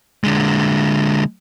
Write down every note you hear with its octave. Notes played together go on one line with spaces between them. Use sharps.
D3 G#3